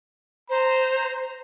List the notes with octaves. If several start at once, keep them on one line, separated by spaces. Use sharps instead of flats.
C5 A#5